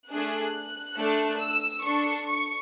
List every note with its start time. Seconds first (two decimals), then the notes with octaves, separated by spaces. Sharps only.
0.11 A3 D4 G#4 F#6
0.98 A3 D4 A4
1.40 E6
1.85 D4 A4 C#6
2.27 C#6